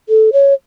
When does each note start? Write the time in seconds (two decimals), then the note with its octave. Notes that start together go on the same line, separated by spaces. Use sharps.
0.09 A4
0.33 C#5